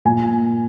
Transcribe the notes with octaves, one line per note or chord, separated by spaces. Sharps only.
A#2 G#5